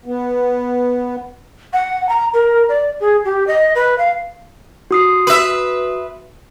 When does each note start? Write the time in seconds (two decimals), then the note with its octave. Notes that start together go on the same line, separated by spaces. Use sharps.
0.06 B3
1.73 F#5
2.09 A#5
2.33 A#4
2.69 D5
3.00 G#4
3.25 G4
3.47 D#5
3.75 B4
3.98 F5
4.91 F#4 D#6 C7
5.27 B4 E5